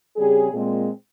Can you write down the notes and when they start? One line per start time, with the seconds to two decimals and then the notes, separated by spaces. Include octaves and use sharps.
0.17 C#3 G3 C4 G#4
0.52 A#2 G#3 C4